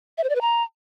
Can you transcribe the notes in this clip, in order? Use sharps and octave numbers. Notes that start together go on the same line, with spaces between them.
E5
C5
D5
B4
A#5